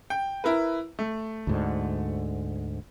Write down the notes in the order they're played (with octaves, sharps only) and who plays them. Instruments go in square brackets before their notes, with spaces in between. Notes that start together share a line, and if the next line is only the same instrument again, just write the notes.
[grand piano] G5
E4 A#4 B4
A3
[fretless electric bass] D2 G#2 D3